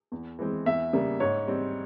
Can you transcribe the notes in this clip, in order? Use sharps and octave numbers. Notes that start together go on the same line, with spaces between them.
E2
E3 G#3 C4
E2 E5
C#3 G3 A#3
G#2 C#5
G3 C4